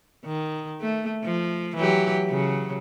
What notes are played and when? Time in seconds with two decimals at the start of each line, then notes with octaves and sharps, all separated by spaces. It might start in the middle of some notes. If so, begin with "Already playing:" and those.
0.25 D#3
0.81 A3
1.24 F3
1.76 E3 F#3 G4
2.29 C#3 F#3